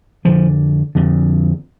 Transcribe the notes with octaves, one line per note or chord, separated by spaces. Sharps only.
F2 D3 F3
F2 D3